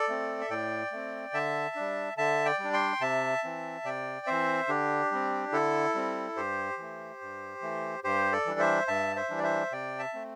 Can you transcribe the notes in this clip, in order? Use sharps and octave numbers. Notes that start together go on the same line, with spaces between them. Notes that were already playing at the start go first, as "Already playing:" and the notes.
Already playing: A4 D5
A3 C4
E5
A2 D5 G5
A3 C4
D3 E5 A5
G3 D4
D3 E5 A5
D5 G5
G3
D4
G5 C6
C3 E5 A5
E3 C4
C3 D5 G5
E3 C4 C5 E5
D3 D4 G4
G3 C4
D3 E4 A4
G3 C4
G2 G4 C5
E3 A3
G2
E3 A3
G2 G4 C5
A4 D5
E3 G3 D4
C5 E5
G2 E5 A5
C5 E5
E3 G3 D4
D5
C5 E5
C3 D5 G5
E5 A5
A3 C4